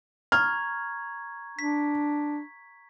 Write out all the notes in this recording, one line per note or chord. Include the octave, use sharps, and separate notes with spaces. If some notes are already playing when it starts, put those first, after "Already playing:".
A#5 C#6 F6 G#6
D4 B6